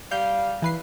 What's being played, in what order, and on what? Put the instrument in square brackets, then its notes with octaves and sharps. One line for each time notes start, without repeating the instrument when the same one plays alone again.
[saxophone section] G3 F5 [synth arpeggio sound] G6
[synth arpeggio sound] E3 B4 C7